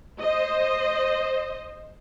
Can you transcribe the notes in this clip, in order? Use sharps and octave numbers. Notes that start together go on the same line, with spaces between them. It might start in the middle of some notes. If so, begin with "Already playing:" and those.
C5 D#5